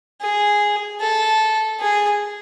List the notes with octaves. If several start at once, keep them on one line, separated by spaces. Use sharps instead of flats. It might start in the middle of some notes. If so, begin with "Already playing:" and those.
G#4
A4
G#4